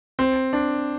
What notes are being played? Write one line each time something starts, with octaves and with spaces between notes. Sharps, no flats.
C4
D4